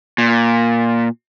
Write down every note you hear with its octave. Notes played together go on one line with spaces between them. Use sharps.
A#2